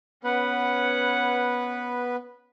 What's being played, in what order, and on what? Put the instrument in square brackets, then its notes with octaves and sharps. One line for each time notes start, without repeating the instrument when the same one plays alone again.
[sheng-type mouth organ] B3 B4 [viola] C#4 F#5